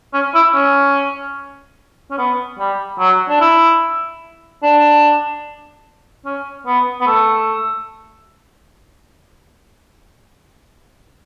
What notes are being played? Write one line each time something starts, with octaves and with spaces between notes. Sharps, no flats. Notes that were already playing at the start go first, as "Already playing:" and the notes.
C#4
E4
C#4
C#4
B3
G3
F#3
D4
E4
D4
C#4
B3
B3
A3